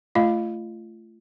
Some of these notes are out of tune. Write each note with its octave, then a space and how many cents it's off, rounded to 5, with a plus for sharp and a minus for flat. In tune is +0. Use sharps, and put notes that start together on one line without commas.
A3 +0 F4 -30 F5 +0